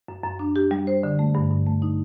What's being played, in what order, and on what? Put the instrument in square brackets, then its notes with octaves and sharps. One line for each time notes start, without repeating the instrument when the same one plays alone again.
[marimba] F#2
F#2
D4
G4
G3
C5
D3
A3
G2
G2
A3
D#4